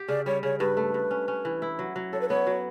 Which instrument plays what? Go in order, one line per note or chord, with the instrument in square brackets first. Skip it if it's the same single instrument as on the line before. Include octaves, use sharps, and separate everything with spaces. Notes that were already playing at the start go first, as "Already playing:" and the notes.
Already playing: [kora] G4
[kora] C#3 [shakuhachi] D5
[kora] G3 [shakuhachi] C#5
[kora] C#3 [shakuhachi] C#5
[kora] G2 [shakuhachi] B4
[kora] A3
G2
C#4
C#4
E3
E4
F#3
F#3
[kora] A4 [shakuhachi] C#5
[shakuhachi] B4
[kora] B3 [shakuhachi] C#5
[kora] F#3